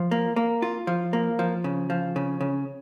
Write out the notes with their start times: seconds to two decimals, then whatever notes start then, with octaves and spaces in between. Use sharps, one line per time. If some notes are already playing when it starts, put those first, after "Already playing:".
Already playing: F3
0.11 A#3
0.36 A#3
0.62 F4
0.87 F3
1.13 A#3
1.39 F3
1.64 C#3
1.90 F3
2.16 C#3
2.41 C#3